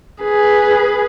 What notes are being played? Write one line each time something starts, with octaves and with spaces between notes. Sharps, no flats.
G#4 B4